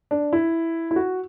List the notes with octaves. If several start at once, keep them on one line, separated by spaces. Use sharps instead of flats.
D4
E4
E4
F#4